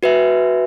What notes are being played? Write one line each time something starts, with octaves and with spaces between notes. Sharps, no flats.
F#4 B4 E5 G#5